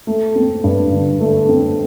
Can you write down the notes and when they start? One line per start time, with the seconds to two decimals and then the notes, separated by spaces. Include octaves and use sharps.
0.07 A3
0.35 C4
0.64 G2
0.92 D3
1.21 A3
1.49 C4